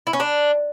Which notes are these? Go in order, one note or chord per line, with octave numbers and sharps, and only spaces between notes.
E4
C#4
D4